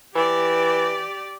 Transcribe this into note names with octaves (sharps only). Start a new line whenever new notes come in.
E3 G4 D5